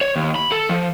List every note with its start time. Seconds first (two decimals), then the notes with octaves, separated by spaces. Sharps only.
0.01 C#5
0.16 D#2
0.36 B5
0.52 A4
0.69 F3